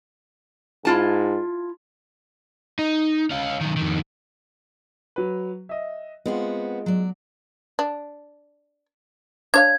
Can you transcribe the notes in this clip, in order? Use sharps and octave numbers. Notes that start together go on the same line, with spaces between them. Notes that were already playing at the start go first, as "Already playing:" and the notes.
G#2 E4 F4 A5
D#4
C#4 F4
D#3 F#3
F2 D#3
F#3 B4
D#5 E5
G#3 B3 C4 F4 F#4
F#3 D5
D4
D4 C#5 F5 G#6